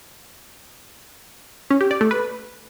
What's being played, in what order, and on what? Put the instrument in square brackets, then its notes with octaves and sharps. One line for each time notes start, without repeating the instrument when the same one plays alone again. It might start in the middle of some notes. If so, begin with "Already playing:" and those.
[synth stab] C#4
G4
D5
A3
B4